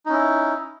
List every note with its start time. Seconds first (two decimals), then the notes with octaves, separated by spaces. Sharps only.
0.06 D#4
0.09 C#4
0.13 E4